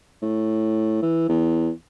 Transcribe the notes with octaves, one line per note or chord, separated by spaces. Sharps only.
A2
E3
E2